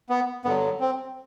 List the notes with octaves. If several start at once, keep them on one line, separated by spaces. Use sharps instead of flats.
B3
G2 D3 F#3 B3
C4